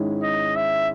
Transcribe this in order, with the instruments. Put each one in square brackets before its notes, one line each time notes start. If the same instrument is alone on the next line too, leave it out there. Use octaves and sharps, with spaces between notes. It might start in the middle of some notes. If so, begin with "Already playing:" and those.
Already playing: [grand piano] G#2 D#3 G#3 C#4 E4
[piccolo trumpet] D#5
E5